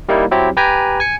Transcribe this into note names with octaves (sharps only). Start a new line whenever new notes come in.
G3 A#3 D#4 E4
F#3 C4 E4 G4
G4 B4 G5 G#5 A#5
G#5 C#7